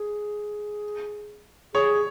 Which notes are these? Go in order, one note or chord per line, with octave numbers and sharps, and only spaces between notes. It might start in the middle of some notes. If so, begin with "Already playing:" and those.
Already playing: G#4
G#4 C#5